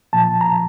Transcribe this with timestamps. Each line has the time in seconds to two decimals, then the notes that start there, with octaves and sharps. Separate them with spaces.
0.13 A#2 F3 A5
0.41 A#5